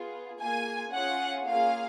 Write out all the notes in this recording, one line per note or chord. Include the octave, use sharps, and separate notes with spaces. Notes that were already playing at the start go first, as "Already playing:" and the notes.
Already playing: B3 F4 G#4
A#3 F4 G#4 G#5
C#4 F4 G#4 F#5
A#3 C#4 F4 G#4 F5